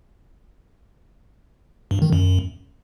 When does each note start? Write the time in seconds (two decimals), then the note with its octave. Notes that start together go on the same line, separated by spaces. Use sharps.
1.91 G2
2.02 D#3
2.13 F#2